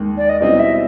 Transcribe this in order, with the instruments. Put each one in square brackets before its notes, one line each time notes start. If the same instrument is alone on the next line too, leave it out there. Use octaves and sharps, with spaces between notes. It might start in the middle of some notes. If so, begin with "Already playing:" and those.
Already playing: [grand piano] D#2 D#3 G#3
[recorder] D5
D#5
[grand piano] B2 G3 C4 E4 [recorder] D#5
[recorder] E5